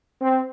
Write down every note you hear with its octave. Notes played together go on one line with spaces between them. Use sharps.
C4